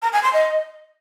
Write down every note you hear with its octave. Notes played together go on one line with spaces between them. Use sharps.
A#5
G#5
C6
D#5